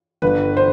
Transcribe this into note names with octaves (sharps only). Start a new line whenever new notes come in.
G1 B4
C5